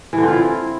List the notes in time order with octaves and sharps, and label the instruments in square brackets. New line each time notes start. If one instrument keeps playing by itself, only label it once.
[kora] E3
D3
C4
F4
E4